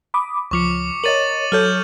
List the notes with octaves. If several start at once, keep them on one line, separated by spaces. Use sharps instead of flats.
B5 D6 D#6
C#2 F3 C#6 D6 C#7
A#4 C#5 D#5 A6 D#7 F#7
F#3 A4 C#5 F6 G6